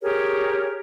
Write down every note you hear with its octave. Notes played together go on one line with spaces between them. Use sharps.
G4 G#4 A#4 C#5